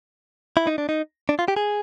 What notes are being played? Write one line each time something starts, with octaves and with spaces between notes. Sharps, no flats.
E4
D#4
D4
D#4
D4
F4
G4
G#4